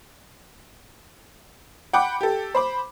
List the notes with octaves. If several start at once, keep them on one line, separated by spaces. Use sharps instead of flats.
F#5 G5 B5 D6
G4 A4
C5 B5 D6